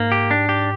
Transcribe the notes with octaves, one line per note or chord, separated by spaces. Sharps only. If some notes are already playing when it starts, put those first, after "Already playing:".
Already playing: G#2 A#3
G4
D4
G4